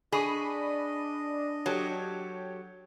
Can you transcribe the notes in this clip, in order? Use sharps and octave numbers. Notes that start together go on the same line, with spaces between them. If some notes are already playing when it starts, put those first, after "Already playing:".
D4 G#4 D#5 B5 C#6 D#7
F#3 G4 A4 C#5